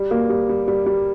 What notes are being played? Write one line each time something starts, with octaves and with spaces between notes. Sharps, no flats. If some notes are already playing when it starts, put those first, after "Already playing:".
Already playing: G3
A#3
G3
G3
G3
G3